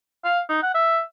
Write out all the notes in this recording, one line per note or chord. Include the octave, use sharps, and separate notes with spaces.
F5
D#4
F#5
E5